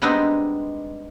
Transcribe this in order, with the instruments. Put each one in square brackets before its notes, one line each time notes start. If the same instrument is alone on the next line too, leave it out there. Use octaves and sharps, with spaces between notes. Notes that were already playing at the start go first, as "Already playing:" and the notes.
[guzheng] G3 G#3 B3 C4 D4 D#4